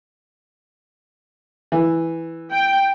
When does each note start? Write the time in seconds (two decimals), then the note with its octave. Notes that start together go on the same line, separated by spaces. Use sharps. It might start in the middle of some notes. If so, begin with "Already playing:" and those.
1.72 E3
2.53 G5